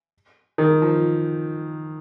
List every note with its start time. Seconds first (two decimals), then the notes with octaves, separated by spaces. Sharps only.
0.58 D#3
0.82 F3